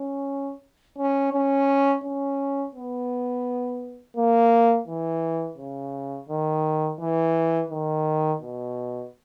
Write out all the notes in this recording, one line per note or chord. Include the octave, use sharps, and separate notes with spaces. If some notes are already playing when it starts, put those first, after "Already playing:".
Already playing: C#4
C#4
C#4
C#4
B3
A#3
E3
C#3
D#3
E3
D#3
B2